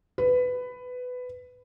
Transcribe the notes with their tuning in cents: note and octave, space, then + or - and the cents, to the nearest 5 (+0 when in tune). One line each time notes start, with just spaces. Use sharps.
B4 +15